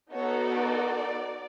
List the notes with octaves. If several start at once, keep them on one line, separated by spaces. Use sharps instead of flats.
B3 D#4 F#4 A4 C#5
D5